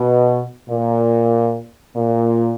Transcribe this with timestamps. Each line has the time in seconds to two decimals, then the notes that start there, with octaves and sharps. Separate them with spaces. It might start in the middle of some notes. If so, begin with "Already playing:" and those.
Already playing: B2
0.69 A#2
1.96 A#2